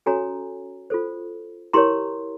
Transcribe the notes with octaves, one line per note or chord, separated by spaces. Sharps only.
C#4 F#4 A4 C#5 G#5 A#5
F4 A4 C5
E4 G4 A#4 C#5 A#5 C6